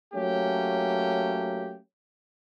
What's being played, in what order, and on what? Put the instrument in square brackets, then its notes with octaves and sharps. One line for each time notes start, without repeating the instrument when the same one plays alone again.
[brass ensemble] F#3 A3 A#3 C#4 G4